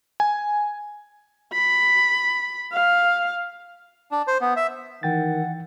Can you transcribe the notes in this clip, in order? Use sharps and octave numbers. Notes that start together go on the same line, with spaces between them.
G#5
B5
F5
D4
C5
B3
E5
D#3 E3 F#5 G5 A6